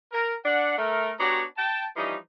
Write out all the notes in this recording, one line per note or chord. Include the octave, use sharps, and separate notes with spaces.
A#4
D4 F#5
A3 A#4
B3 D4 F#4 G4 C#5 A#5
G5 A5
E3 F3 G3 C#4 D#4